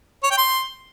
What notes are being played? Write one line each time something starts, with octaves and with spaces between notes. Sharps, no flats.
C#5
G5
C6